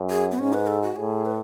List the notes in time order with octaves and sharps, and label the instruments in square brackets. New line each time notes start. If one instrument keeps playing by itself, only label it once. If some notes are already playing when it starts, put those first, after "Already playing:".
Already playing: [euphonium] F#2
[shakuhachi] G#4
B3
[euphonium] G#2 [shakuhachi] C#4
[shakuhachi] B4
A4
F#4
[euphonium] A2 [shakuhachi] G#4
[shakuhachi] B4